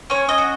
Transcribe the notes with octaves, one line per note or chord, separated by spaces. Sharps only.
C#4 C#5
D#5
F#4